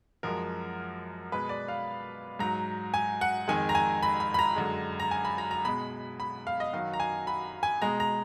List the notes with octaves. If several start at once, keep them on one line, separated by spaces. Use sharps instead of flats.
F#2 F3 G#3 A#4
B2 G#3 B4
D5
F5
G#2 F#3 A#5
G#5
F#5
F2 D#3 G#3 G#5
A#5
G#5
B5
B5
B5
A#5
F#2 D3 G#3
A#5
G#5
B5
A#5
A#5
B2 G#3 B5
B5
F5
D#5
F#2 D#3 F#3 F5
A#5
G#5
B5
G#5
B2 G#3 A#5
A#5